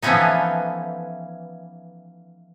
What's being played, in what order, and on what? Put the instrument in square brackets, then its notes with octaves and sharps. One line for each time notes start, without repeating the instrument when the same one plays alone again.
[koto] E3 F3 A3 B3 C#4 D#4